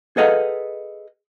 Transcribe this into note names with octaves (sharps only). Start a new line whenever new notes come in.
G#4 A4 B4 D#5 F5 F#5